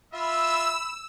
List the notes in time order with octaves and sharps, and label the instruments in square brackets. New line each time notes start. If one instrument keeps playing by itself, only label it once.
[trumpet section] F4 E5 [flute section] B5 [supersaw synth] E6